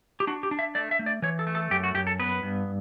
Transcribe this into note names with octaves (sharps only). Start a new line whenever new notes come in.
G4
D4 F#4
G4
D4
E5
A3 D5
E5
A3
D5
E3 C#5
A4
A3
A4
F#2 G4
F#4
F#2 G4
A4
B3 B4
G2